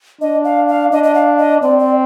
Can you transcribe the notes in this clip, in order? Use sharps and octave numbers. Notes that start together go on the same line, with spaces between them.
D4 D#5
F5
F5
D4 D#5
D#5
F5
D#5
C4 D5
D5